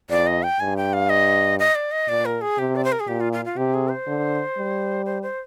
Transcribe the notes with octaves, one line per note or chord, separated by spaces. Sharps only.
F2 D5
D#5
G5
G2 G#5
G5
F5
D#5
D#5
D5
D#5
A#2 D5
A#4
G#4
C3 G4
D5
C5
A#4
G#4
A#2 G4
F4
F4
F4
C3 G4
G#4
C5
D3
G3
C5
C5